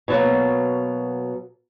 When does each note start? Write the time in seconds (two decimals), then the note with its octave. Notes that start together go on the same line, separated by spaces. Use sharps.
0.08 B2 F#3 A#3